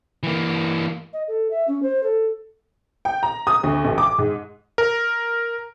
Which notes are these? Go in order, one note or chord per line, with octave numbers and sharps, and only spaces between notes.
E3 A#3
D#5
A4
E5
C#4
C5
A4
G5
A#5
D#6
D2
A1
D6
G#2
A#4